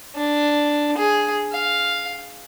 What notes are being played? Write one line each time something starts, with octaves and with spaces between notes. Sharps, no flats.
D4
G#4
F5